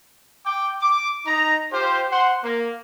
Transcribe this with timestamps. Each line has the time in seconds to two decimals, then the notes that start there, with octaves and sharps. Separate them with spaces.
0.46 G5 D6
0.80 D6
1.26 D#4 A#5
1.71 F4 G4 C5
2.12 C5 F#5 C6
2.43 A#3